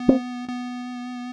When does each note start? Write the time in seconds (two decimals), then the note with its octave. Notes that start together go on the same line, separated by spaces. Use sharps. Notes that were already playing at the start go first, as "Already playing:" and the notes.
Already playing: B3
0.08 A#3 C4
0.49 B3